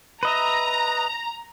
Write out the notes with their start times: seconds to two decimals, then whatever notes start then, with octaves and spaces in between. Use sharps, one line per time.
0.23 B4 D#5 E5 A#5